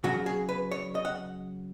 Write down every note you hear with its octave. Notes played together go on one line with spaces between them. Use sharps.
C#3 F#3 F#4
G#4
B4
C#5
D#5
F#5